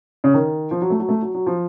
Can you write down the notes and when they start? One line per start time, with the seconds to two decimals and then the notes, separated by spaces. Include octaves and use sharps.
0.24 C#3
0.34 D#3
0.71 F3
0.82 F#3
0.90 A3
1.00 F#3
1.09 A3
1.22 F#3
1.34 F#3
1.47 F3